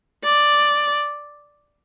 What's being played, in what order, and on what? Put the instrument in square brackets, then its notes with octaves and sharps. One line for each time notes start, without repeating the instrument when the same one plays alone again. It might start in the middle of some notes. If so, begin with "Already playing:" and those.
[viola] D5